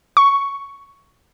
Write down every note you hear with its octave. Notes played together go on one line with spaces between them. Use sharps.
C#6